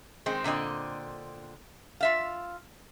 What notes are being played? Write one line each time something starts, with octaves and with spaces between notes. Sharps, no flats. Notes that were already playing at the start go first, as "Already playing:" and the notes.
D#3 G#3 C4
A#2 D3 C4 D#5
F4 E5 F5